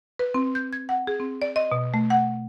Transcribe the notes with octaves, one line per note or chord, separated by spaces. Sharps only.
B4
C4
G6
G#6
F#5
G#4
C4
D5
D#5
B2
A3
F#5